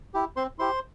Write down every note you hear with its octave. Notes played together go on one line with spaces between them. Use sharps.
E4 G4
C4 C5 C6
E4 G4 C5 C6